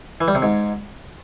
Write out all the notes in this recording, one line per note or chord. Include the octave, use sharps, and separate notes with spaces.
E3
G3
C3
G#2